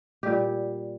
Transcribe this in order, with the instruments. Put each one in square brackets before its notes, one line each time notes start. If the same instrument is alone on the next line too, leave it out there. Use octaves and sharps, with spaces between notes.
[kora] A#2 G3 G4